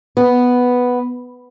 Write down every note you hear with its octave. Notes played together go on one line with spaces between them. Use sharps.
B3